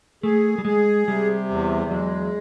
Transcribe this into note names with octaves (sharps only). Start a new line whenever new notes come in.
A3 G#4
G3
G#3 G#4
C3 G3
E2
F#3 G#3